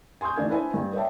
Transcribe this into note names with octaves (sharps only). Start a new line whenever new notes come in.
G#5 C6 C#6 D#6 G6
E3 A3 D4 G#6
D4 E4 B4 C5 G#5
G2
B4 C#5 D5 E5 G5 A5